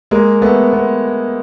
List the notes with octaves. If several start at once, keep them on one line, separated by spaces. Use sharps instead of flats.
G#3 A#3
A3 B3
B3